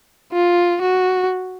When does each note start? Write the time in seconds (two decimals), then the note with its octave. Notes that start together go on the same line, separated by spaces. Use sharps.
0.32 F4
0.82 F#4